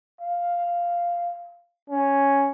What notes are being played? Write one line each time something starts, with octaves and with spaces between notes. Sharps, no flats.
F5
C#4